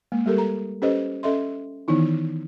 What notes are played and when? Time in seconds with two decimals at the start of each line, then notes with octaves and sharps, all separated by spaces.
0.12 G#3 A#3
0.26 G3 G4 A4 A#4
0.37 A4 A#5
0.82 C#4 G4 A4 B4 C5 D#5
1.23 C#4 A4 D#5 E5 C6
1.88 D#3 E3 B3 D#4 E4